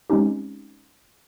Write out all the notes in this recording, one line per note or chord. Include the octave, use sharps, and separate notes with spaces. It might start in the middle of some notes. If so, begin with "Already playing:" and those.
G#3 C4 C#4 D#4 G4